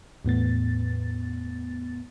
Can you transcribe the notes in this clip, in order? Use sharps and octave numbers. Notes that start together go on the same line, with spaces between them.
E2 A2 B3 A6